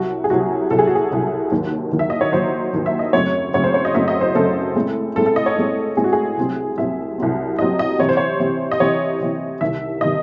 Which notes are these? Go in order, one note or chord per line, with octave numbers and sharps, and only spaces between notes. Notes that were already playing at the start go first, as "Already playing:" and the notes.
Already playing: C2 C3 F#3 F#4
G#4
C2 C3 F#3 F#4
C2 C3 F#3 A4
G#4
F#4
G#4
C2 C3 F#3
D#2 D#3 F#3
D#2 D#3 F#3
E5
D#5
C#5
D#2 D#3 F#3 C5
D#2 D#3 F#3
E5
D#5
F#2 C#3 F#3 A3 C4 C#5
F#2 C#3 F#3 A3 C4 C#5
C5
C#5
D#5
F#2 C#3 F#3 A3 C4 E5
D#5
C5
F#2 C#3 F#3 A3 C4 A4
A2 G#3 C4
A2 G#3 C4 A4
A4
D#5
C#5
A2 G#3 C4
A2 G#3 C4 G#4
F#4
G#4
C2 C3 F#3 C4
C2 C3 F#3 C4 E5
C2 C3 F#3 C4
C2 C3 F#3 C4 D#5
D#5
C3 E3 C4 C#5
C5
C#5
C3 E3 C4
D#5
C3 E3 C4 C#5
C3 E3 C4
C2 C3 D#3 E5
C3 D#3 D#5